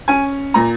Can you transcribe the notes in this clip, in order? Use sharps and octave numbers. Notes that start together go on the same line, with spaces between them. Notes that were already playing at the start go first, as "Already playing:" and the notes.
C#4 G#5
A#2 A#5